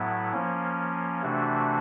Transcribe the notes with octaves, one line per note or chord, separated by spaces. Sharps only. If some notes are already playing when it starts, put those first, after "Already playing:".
Already playing: A2 F#3 B3 E4
F3 A#3 C#4
C3 E3 A3 D4 F#4